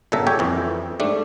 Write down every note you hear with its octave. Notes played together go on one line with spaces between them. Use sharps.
G1 A#2 C#3 A4 E5 A#5
G4 C#5 E5 G5 G#5
F2 E3
G#2 G3 A3 D4